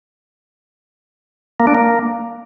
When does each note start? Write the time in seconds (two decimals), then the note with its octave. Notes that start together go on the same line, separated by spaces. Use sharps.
1.60 A#3
1.67 D4
1.75 A#3